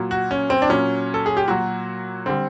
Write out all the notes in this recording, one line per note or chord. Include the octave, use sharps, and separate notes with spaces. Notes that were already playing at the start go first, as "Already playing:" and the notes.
Already playing: A#2 F#3
F#4
C#4
C4
D4
A#2 F#3 C#4
A4
G#4
G4
A#2 F#3 F#4
D3 G3 C4